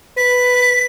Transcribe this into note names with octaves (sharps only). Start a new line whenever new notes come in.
B4 B6